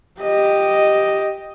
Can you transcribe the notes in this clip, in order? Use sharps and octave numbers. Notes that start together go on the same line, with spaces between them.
G4 D#5